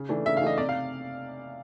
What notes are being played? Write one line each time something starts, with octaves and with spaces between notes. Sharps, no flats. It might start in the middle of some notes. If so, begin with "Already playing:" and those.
Already playing: C#3
E3 A3 D4
C#3 E5
F5
E3 A3 D4 D#5
C3 D5
F5